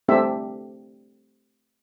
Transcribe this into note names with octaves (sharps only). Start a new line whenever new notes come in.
A3 C4 D4 G4 E5